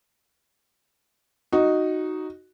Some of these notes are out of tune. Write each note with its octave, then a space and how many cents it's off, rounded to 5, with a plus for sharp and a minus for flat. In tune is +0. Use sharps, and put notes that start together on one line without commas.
D#4 +0 F#4 +0